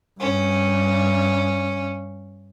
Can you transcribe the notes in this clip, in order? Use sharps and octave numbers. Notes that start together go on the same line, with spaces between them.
G2 C#4